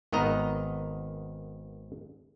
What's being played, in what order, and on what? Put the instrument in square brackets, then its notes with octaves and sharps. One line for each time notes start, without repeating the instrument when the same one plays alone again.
[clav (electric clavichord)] G#1 D#3 B3 D#5 A#5